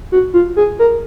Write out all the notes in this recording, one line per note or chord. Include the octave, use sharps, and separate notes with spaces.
F#4
F4
G#4
A#4